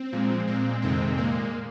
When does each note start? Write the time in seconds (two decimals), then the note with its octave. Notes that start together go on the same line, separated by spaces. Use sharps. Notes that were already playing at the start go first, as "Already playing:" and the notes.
Already playing: C4
0.13 A#2 F3 G#3
0.47 A#2 G#3 C4
0.82 F2 C3 D#3 G#3 C4
1.17 A#2 G#3 A#3